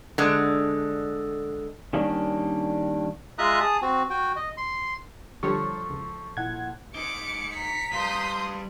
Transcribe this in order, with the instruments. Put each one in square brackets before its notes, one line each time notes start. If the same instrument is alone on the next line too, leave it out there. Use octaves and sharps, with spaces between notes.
[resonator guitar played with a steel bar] D3 G#3
[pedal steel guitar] D#3 G3 A#3 C#4 D4
[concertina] G#3 F4 E5 A#5 D#6 F#6
G#4 A5 D#6
C4 F#4
F#4 G5
D#5
C6
[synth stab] D3 G3 C#5 [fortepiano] F3 A4 [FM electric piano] C#6
[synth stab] C#2
[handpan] A#2 E4 [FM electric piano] F#5 G#6
[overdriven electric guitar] D#4 C5 [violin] D6 [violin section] C#7
[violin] A#5 B6
[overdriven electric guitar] G3 F5 [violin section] C6 D#6 G6